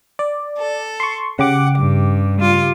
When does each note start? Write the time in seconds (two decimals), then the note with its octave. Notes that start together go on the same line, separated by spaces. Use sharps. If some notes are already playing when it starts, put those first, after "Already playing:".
0.19 D5
0.58 A4
1.00 C6 C#6
1.39 C#3 G4 F#5 D6
1.79 G2
2.41 F4